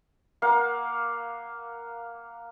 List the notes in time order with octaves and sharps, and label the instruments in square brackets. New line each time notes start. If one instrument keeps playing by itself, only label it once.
[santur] A#3 F5 F#5